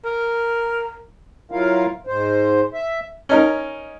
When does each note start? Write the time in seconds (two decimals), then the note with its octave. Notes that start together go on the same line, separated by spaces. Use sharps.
0.04 A#4
1.52 F#3 E4 F4 A#4 F5
2.07 G#2 C5
2.74 E5
3.29 C#4 D#4 A#4